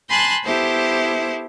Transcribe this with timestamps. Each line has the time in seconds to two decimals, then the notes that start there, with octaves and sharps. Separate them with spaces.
0.10 G#5 A5 B5 C6 F#6 G6
0.44 B3 E4 G4 A4 C5